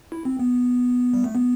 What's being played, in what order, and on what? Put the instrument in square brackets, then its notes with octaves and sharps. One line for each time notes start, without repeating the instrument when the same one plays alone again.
[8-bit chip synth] E4
C4
B3
G3
A3
B3